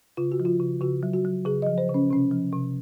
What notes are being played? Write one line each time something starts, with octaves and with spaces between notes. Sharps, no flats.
C#3 F4
F#4
F3
F4
C#3
C#3 F#4
F#3
F#4
F#3
C#3 G#4
F3 D#5
C5
C#3
C#4
C3 C#4
F3
C3